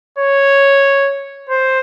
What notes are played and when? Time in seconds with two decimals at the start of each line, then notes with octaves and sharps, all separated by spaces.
0.18 C#5
1.49 C5